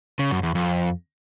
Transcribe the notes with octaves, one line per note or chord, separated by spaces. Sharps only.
C#3
F#2
E2
F2